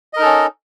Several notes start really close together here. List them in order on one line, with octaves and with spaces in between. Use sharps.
D#5 A#4 D#4 A4 C#4